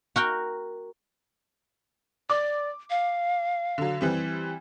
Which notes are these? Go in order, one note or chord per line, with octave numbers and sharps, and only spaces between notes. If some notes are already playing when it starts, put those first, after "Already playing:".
F#4 A#4 G5
D5 D6
F5
D3 F#3
E3 G3 C4